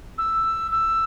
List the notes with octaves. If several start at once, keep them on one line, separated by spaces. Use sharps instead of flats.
E6
E6